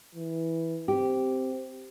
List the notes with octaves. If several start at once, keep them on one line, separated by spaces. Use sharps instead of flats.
E3
C4 G4